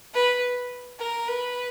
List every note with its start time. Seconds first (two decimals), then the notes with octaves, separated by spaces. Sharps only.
0.14 B4
0.99 A#4
1.28 B4